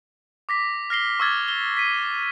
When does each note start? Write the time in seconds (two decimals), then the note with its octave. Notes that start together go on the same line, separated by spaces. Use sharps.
0.49 D6 A#6 B6
0.90 F6 A#6 C7 G7
1.20 C#6 D6 E6 F6 G#6 A6
1.48 G7
1.77 B6 D#7